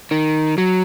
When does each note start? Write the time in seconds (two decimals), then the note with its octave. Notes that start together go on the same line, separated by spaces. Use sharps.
0.11 D#3
0.58 F#3